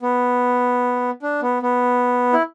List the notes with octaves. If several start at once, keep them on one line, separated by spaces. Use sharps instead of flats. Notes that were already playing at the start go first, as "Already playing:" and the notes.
B3
D4
B3
B3
E4